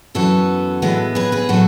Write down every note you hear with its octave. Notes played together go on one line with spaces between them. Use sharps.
F#2 E3 B3 F#4 A4
A2 E3 G#3 B3
G#4 B4
G#4 B4
A2 F#3 A3 F#4 A4